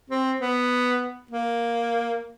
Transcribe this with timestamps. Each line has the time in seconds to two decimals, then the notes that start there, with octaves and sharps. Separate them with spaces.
0.10 C4
0.41 B3
1.31 A#3